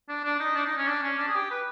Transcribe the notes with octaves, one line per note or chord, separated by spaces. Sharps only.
D4
D4
D#4
D4
D#4
C#4
D4
C#4
D4
G#4
G4
B4